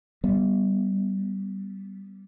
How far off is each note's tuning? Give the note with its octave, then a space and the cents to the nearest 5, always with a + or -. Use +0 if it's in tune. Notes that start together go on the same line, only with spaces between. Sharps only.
G3 -10 B3 -5